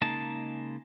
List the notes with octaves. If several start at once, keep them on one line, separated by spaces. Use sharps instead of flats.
C#3 G#3 A#3 D#4 A5